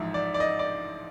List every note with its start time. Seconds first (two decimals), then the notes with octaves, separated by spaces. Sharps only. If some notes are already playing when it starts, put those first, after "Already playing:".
Already playing: A1 G#2 F3 E5
0.14 D5
0.34 D5
0.40 D#5
0.59 D5